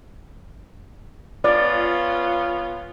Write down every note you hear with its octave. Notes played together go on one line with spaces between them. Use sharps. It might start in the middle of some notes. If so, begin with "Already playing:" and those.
B3 C#4 F4 D5